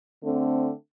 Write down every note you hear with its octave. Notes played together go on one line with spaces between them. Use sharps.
D3 A3 C4